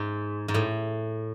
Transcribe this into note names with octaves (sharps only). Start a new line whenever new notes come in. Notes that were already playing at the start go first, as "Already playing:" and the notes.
Already playing: G#2
G#2
A2